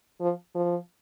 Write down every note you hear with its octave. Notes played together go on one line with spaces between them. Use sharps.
F3
F3